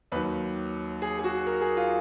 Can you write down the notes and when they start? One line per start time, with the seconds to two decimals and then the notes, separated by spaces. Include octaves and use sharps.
0.12 D#2 D#3 F#3 B4
1.02 G#4
1.19 G#4
1.24 F#4
1.47 A#4
1.61 G#4
1.77 F4